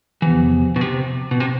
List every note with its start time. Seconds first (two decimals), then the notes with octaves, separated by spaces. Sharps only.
0.22 E2 C3 E3 F3 B3
0.76 B2
0.81 C3
1.31 B2
1.40 C3